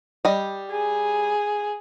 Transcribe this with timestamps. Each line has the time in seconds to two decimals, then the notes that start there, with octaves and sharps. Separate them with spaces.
0.25 G3 D#5
0.72 G#4